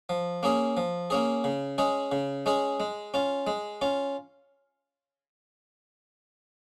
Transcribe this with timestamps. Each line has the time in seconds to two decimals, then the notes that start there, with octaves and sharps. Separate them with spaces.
0.09 F3
0.43 A#3 C#4 G#4
0.77 F3
1.10 A#3 C#4 G#4
1.44 C#3
1.78 G#3 C#4 G#4
2.12 C#3
2.46 G#3 C#4 G#4
2.80 G#3
3.14 C#4 F4
3.47 G#3
3.82 C#4 F4